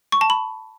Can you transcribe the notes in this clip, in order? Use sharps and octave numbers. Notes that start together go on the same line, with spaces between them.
C#6
A5
B5